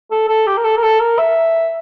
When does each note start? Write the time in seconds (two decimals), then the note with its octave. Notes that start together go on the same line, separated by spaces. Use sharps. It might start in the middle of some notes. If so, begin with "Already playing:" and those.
0.11 A4
0.28 A4
0.47 G4
0.57 A#4
0.64 A4
0.77 A#4
0.83 A4
1.00 A#4
1.18 E5